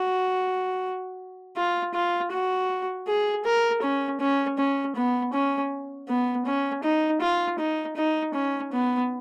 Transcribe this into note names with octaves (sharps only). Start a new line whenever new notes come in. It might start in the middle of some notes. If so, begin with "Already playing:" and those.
Already playing: F#4
F4
F4
F#4
G#4
A#4
C#4
C#4
C#4
B3
C#4
B3
C#4
D#4
F4
D#4
D#4
C#4
B3